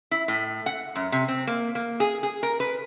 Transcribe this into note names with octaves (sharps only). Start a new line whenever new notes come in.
E4
A2
F#5
F#2
C3
C4
A#3
A#3
G#4
G#4
A#4
B4